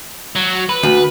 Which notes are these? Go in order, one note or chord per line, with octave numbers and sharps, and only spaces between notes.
F#3
B4
D2